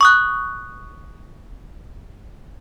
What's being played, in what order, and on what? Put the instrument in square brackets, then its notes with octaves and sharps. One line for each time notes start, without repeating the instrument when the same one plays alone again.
[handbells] C#6 D#6 F#6